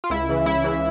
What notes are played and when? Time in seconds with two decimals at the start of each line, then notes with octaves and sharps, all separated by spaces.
0.04 F4
0.10 C#2 E4
0.29 C#3 E3
0.46 C#2 E4
0.64 C#3 E3